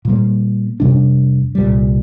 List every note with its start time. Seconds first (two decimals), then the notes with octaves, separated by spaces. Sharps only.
0.05 A#2 G3 A#3
0.80 F2 C3 G3 D4
1.55 C2 A#2 G3